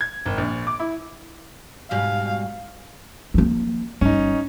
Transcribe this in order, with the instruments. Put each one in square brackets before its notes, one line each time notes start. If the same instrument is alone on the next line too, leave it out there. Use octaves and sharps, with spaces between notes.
[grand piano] G#6
G#1
A#1
D6
E4
[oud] G#2 B2 G3 [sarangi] F5
[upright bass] F3 A#3
[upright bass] G1 [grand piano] C#4 D#4